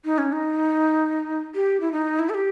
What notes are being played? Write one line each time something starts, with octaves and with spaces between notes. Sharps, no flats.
D#4
C#4
D#4
G4
E4
D#4
E4
A4
G4